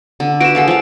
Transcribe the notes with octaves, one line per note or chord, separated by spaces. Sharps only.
D3
F#4 B4 D7 E7
G#3 A4 F5
F3 F5